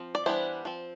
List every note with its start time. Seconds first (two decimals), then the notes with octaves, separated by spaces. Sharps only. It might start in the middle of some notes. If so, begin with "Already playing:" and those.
Already playing: F3 C4
0.15 D5
0.26 E3 G3 B3 D4 C5
0.65 F3 C4